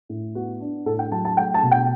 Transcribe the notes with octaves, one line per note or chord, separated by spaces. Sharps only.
A2
B3 F#4
D4
A2 A4
G5
F#3 A5
A5
A3 G5
A5
B2
G5